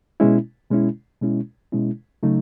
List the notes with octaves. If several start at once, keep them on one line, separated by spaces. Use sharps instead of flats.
B2 G#3 C#4 E4
B2 G#3 C#4 E4
B2 G#3 C#4 E4
B2 G#3 C#4 E4
C#3 F#3 A3 D#4